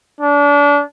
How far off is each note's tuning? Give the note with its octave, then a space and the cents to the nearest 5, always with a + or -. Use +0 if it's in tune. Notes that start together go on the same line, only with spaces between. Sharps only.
D4 -30